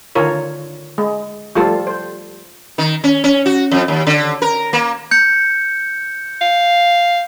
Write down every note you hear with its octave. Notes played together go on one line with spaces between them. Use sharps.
D3 D#3 F4 A#4 C#5
G#3
F3 G3 A3 F4 A4
C5
D#3
C#4
C#4
F#4
F2
D#2
D3
A#4
A#3
G6 C#7
F5